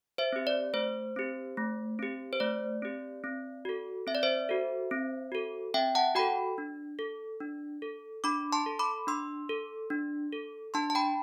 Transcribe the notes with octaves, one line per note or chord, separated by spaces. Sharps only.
C5 E5
C4 G4
D5
A3 C5
C4 G4
A3
C4 G4
C5
A3 D5
C4 G4
C4
F#4 A4
C4 E5
D5
C5 E5
F#4 A4
C4
F#4 A4
C4 E5 G5
F#5 A5
F#4 A4 G5 B5
D4
A4
D4
A4
D4 B5 D6
A5 C6
A4
B5 D6
D4 C6 E6
A4
D4
A4
D4 A5 C6
A5
G5 B5